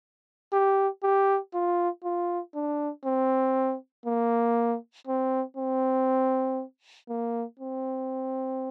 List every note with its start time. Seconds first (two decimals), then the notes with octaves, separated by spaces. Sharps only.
0.53 G4
1.03 G4
1.54 F4
2.04 F4
2.55 D4
3.05 C4
4.06 A#3
5.07 C4
5.57 C4
7.09 A#3
7.59 C4